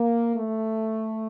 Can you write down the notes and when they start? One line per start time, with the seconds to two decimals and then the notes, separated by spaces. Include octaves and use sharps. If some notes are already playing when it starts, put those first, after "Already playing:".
Already playing: A#3
0.35 A3